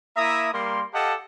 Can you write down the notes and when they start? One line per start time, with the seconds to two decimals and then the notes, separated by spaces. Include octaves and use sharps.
0.17 A#3 E4 E5 A#5 D#6
0.53 G3 A#3 A#4 C6
0.94 G4 A4 D#5 F5 F#5 A5